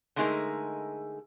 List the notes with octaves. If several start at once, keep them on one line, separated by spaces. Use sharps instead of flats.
D3 G#3 A3 D#4 G#4 A#4